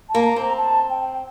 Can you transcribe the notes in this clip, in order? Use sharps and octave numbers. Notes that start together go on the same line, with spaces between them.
A5
A#3
A#5
C4 A#5
A5
G5